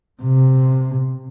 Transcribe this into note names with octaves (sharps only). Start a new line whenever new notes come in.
C3